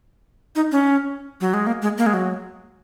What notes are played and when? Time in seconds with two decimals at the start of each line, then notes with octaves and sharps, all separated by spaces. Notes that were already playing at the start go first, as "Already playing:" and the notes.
0.56 D#4
0.72 C#4
1.41 F#3
1.54 G#3
1.67 A#3
1.82 G#3
1.98 A#3
2.06 G#3
2.14 F#3